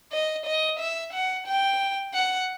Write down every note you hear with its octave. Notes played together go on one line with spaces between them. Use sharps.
D#5
D#5
E5
F#5
G5
F#5